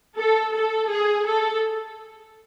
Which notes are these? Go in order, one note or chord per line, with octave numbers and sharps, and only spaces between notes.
A4
A4
G#4
A4